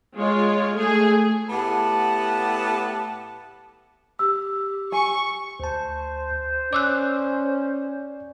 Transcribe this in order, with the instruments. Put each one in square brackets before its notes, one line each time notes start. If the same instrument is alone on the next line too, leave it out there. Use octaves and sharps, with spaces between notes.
[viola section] G#3 F4 C#5
A3 G#4 G#5
[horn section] A2 B3 G4 F#5 A5
[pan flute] G4 [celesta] E6
[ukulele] G#5 [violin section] C#6
[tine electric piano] D2 A5 [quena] C5
[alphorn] C#4 [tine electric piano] D5 [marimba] D6 E6 F#6